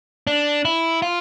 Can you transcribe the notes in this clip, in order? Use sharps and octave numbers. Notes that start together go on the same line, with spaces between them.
D4
E4
F4